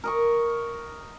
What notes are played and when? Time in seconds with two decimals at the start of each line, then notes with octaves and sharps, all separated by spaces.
0.04 A#4 D#5 C#6